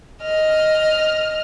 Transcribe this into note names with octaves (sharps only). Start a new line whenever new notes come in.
D#5 F6